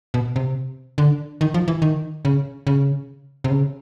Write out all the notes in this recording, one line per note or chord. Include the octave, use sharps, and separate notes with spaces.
B2
C3
D3
D#3
F3
E3
D#3
C#3
C#3
C3
C#3